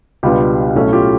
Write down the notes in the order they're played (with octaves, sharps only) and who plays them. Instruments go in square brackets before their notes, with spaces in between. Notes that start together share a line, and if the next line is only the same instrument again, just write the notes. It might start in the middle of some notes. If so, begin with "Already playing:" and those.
[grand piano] C#2 B2 G3 B3 D4 F4 G4
B1 A2 F#3 A3 C#4
F4 G4